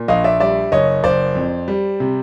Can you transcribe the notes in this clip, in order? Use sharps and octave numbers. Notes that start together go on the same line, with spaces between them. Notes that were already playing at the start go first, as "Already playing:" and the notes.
Already playing: A#2
A#1 D#5 F5
D5 E5
G3 D5 E5
F#1 C#5 D#5
F#1 C5 D5
F2
G3
C3